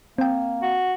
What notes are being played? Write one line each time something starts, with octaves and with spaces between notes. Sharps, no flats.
A#3 C4 G5
F#4